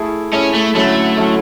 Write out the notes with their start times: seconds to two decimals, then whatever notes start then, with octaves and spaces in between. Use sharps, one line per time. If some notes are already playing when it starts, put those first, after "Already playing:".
Already playing: A3 E4 G#4
0.33 A3 C#4 E4 G#4
0.54 A3
0.75 D3 F#3 A3 C#4 E4 A4
1.17 D3 F#3 C#4 E4 A4